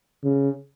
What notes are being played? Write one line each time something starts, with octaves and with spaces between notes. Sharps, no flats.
C#3